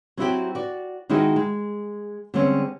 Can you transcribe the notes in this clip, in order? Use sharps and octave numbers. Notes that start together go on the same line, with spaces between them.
F#3 C4 D#4 E4 F#4 G4
F#4 D5
D#3 G#3 D#4 E4 F#4 G#4
G#3
D3 G3 G#3 C4 C#4